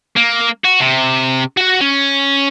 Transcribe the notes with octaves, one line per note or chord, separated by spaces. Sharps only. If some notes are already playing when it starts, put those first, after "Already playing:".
A#3
F#4
C3
F#4 F#5
C#4